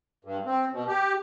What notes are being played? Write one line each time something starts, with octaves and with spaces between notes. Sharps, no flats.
G2
C4
B2
G4